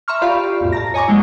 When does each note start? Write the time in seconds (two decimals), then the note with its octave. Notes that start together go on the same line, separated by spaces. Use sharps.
0.08 E5 A#5 C6 C#6 F6
0.22 F4 G4 D5 F5 B5
0.61 B1 F2 A2
0.72 A5 A#5 A#6
0.94 C#5 D#5 G#5 A#5 C#6 D6
1.08 E2 F#3 G#3 A#3 E4